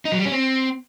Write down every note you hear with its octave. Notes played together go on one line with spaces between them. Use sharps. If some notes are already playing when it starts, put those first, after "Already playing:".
D#4
F#3
G3
C#4
C4